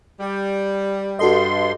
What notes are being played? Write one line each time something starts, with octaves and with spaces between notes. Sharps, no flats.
G3
G2 F#4 A4 D#5 C6